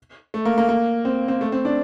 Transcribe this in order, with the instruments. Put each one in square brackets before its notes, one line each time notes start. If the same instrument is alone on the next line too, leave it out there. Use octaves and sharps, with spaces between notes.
[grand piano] A3
A#3
A#3
A#3
C4
C4
A3
C4
D4